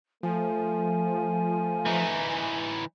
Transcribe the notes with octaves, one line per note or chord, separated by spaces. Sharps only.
F3 A3 G#5
E3 D#4